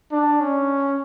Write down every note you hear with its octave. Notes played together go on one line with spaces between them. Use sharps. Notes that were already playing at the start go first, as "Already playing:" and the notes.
D4
C#4